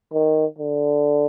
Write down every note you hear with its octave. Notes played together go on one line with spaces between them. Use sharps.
D#3
D3